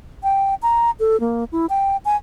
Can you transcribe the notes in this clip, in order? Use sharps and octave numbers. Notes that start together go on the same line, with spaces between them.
G5
A#5
A4
A#3
E4
G5
G#5